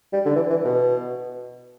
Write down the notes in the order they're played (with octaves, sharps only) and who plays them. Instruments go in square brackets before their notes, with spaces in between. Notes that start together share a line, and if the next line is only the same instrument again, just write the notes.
[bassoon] G3
D3
E3
E3
B2